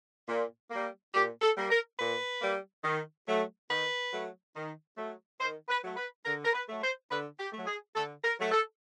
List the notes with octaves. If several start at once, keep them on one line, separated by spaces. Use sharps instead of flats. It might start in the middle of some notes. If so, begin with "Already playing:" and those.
A#2
G3 A#3
A#2 G4
A4
G3 A#3
A#4
A#2 B4
G3 A#3
D#3
F#3 A3
D#3 B4
F#3 A3
D#3
F#3 A3
D#3 C5
B4
F#3 A3
B4
D3 A#4
A#4
B4
F#3 A3
C5
D3 B4
G4
F#3 A3
G#4
D3 A4
A#4
F#3 A3
A4